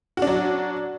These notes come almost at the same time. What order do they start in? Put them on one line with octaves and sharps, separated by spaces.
F#4 D4 F#3